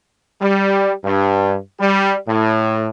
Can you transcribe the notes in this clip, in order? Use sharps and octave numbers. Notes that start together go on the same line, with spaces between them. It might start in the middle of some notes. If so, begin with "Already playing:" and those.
G3
G2
G3
A2